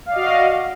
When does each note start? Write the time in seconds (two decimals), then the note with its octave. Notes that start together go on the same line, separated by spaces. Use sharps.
0.06 F5
0.09 D5
0.13 D#5
0.16 F#4